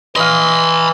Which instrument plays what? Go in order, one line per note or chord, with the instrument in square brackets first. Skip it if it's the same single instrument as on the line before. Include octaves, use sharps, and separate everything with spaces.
[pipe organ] E3 [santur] D#5 F5 [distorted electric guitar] B5 C6